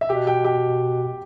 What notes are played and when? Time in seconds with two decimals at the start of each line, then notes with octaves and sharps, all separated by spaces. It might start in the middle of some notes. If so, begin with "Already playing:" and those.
0.01 E5
0.09 B2 G4 G5
0.27 G4 G5
0.44 G4 G5